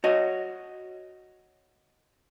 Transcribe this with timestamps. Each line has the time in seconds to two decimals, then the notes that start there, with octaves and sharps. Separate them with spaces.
0.04 F#4 C#5 D#5